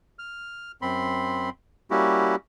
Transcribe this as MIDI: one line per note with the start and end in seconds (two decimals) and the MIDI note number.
0.19 0.72 89
0.82 1.50 42
0.82 1.50 60
0.82 1.50 83
0.82 1.50 84
1.91 2.35 55
1.91 2.35 58
1.91 2.35 61
1.91 2.35 64
1.91 2.35 66
1.91 2.35 67